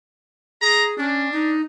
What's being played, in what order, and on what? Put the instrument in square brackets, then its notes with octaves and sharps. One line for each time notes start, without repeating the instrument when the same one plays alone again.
[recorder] G#4 [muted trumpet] A#5
[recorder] C#4 [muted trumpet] D4
[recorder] D#4